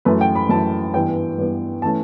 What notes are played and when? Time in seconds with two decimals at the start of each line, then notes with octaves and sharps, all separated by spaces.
0.05 F#2 E3 A3 B4
0.21 G5
0.35 B5
0.49 F#2 E3 A3 A5
0.94 G2 E3 B3 G5
1.38 G2 E3 B3
1.82 E3 A3 C#4 A5